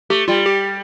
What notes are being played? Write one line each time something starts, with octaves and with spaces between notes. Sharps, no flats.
A3 G4
G3 F4
G4